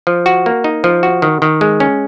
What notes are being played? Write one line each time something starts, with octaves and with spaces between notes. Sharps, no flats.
F3
F#4
A#3
D#4
F3
F#4
D#3
D#3
G#3
C#4